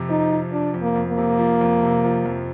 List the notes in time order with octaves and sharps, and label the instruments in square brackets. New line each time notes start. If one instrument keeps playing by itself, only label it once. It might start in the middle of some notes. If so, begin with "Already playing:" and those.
Already playing: [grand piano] F2 C3
[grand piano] F3 [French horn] D#4
[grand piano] F3
[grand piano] F3 [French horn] D4
[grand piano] F2
[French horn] A#3
[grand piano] F2
[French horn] A#3
[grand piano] C3
F3
F2
C3
F3
F2